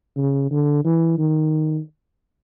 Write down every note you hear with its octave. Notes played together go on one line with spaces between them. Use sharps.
C#3
D3
E3
D#3